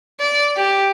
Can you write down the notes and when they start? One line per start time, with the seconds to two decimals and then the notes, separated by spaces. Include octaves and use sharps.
0.20 D5
0.57 G4